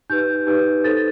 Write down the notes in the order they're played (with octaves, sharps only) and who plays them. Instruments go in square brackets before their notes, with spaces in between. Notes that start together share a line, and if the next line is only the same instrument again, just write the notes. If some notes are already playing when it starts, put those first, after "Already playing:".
[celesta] D#4 G4 B4 G6
D#4 G4 B4
D#4 A4 C5 A6